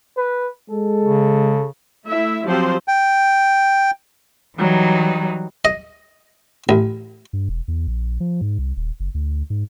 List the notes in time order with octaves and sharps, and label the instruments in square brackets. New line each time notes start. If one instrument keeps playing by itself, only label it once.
[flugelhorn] B4
[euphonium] G#3 [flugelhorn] A4
[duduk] C#3
[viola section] A3 E4 E5
F3 F#3 C4 G4 C5
[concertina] G5
[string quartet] E3 F#3 G3 D#4
[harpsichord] D#5
A1
[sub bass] G2
E1
E2
A#1
F3
G#2
C2
D#1
F#1
D2
G#2